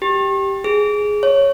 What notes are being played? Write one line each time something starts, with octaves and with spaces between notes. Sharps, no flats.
G4
G#4
C#5